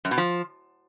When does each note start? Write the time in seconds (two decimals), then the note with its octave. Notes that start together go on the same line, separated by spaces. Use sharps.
0.05 F#2
0.11 B2
0.18 F3